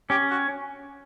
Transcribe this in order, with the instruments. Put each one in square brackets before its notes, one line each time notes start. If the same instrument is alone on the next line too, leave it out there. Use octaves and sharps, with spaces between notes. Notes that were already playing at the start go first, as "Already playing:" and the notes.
[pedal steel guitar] C#4 [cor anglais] G4
[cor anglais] F#4